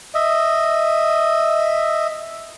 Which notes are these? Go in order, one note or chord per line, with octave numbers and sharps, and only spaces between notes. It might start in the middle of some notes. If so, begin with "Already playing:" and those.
D#5 E5